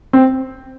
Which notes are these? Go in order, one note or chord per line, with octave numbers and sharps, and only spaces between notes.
C4